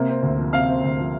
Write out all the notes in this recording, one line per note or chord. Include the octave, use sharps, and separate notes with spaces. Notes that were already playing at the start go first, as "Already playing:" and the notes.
Already playing: C3 A#3
C4
D2
F3
C3 F5 F6
C4
D2
F3